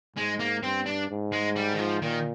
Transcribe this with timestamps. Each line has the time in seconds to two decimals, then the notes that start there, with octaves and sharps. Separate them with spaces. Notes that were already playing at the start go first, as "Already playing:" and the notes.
0.16 G#2 G#3
0.39 A#3
0.63 G2 C4
0.86 D4
1.10 G#2
1.32 G#3
1.56 G3
1.74 D#3
1.79 F3
2.02 A#2 D#3